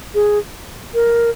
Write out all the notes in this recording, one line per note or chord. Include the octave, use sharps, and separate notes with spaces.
G#4
A#4